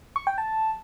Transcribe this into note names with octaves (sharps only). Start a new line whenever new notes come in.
C#6
G5
A5